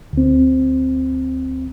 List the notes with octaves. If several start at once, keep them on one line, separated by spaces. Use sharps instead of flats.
D2 C4